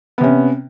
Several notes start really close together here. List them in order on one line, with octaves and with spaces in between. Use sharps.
B3 C3 C#4